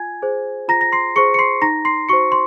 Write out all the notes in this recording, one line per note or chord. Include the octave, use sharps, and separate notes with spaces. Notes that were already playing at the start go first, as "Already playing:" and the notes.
Already playing: F4 G#5 G#6
G#4 C5
F4 A#5 A#6
A#6
C6 C7
G#4 C5 C#6 C#7
C#7
C6 C7
D#4 A#5 A#6
C6 C7
F#4 C5 C#6 C#7
C6